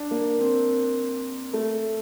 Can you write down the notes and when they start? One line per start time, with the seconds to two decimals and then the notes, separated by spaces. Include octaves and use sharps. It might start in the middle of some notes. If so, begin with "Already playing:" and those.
Already playing: D4
0.11 A#3
0.40 C4
1.53 A3